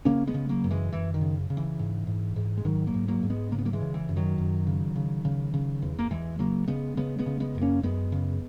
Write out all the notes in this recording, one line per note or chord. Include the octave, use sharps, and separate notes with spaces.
C#3 A#3 C#4
G#3 B3
C#3
F#3 A#3
F#2
E3 G#3
F#2 E3
D#3
C#3
C#3
E3
G#2
G#2
G#2
G#3
G#2 D#3 F#3
F#3 A#3
G#2
F#3 A#3
G#2
G#3 B3
C#3 A#3
B3
F#3 A#3
E3 G#3
C#3
E3
F#2
D#3 F#3
F#2
C#3
C#3
C#3
C#3
E2
A#3
E2 E3 G#3
C#3 F#3 A#3
C#3 G#3 B3
C#3 G#3 B3
G#3 B3
C#3
G#3 B3
F#2
A#3 C#4
F#2 G#3 B3
C#3